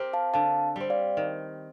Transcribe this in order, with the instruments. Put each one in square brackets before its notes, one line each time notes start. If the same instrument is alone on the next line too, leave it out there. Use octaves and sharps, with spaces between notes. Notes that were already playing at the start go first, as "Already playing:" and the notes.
Already playing: [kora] C4 G4 A#4
[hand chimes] F5 A5
[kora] D3 [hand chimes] F5 A5
[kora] G3 C4
[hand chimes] D5 F5
[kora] D#3